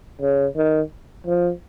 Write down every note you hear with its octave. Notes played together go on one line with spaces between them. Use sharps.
C#3
D#3
F3